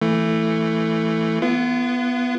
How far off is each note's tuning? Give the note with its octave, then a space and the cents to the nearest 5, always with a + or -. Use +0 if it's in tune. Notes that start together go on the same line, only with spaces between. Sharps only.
E3 +0 A3 +10
B3 +0 F4 -40